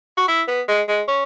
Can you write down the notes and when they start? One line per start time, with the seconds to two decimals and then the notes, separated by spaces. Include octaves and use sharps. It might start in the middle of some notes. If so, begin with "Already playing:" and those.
0.18 F#4
0.28 E4
0.48 B3
0.68 G#3
0.89 G#3
1.08 C#4